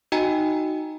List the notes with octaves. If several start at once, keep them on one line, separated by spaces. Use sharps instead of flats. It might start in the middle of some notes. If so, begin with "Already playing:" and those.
D#4 F#4 D#5 G5 G#5 A#5